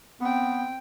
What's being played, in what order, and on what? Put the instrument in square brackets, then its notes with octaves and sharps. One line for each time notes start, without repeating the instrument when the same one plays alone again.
[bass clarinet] B3 [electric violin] C4 G5